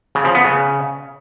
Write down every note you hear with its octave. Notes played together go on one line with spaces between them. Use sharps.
C#3
F3
B3
C#3